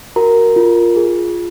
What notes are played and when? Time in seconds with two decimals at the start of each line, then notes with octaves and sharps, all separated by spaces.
0.16 F#4 A#4 A#5
0.56 F4
0.96 G#4